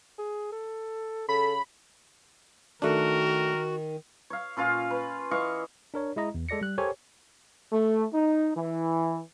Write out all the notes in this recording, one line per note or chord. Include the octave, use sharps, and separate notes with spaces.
G#4
A4
C#3 A4 B5
D#3 A3 D4 F#4 A#4
C#5 F5
A#2 C#4 F4 F5
B4
E3 D#5 F5 C#6
D4 A#4 C#5
G#3 E4 D#5 A#5
E2
G#3 A4 D5 A#6 C#7
G3 F#6
G4 A4 A#4 C5 C#5 G#5
A3
D#4
E3